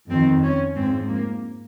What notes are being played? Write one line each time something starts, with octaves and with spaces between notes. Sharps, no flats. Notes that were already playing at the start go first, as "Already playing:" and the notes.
F2 D#3 C4
C#4
G#2 F3 C4
A#3